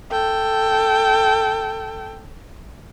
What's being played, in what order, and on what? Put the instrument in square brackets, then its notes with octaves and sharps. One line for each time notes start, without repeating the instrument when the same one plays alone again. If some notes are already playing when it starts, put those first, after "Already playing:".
[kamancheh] A4 G5